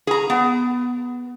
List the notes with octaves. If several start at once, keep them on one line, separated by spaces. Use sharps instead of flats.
G#4 A#5
B3